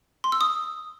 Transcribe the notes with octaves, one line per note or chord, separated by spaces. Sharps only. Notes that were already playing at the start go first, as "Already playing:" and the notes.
C6
E6
D#6